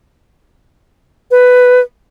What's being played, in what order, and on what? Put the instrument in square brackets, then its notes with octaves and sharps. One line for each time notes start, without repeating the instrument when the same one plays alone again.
[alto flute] B4